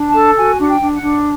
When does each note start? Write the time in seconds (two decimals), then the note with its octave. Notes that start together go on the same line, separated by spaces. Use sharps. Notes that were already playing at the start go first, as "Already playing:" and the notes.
Already playing: D4
0.08 A5
0.14 A4
0.36 F#4 G#5
0.58 D4 F#5
0.66 G5
0.81 D4
0.94 F#5
1.02 D4